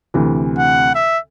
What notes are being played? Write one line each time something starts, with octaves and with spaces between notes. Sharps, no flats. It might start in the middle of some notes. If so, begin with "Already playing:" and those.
D2 C3 E3
F#5
E5